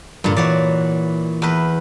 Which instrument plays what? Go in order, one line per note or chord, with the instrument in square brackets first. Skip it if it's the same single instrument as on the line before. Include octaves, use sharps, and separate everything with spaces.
[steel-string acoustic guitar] G2 D3 [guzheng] A#2
[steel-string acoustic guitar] E3 [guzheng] F#4 C#5 D5
[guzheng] E2 B4